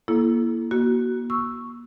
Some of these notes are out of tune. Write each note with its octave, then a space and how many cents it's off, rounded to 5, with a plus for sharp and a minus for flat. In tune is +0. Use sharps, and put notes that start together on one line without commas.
A#3 +25 E4 +20 A4 -30
A#3 +40 F#4 +20
C#6 +0 E6 +0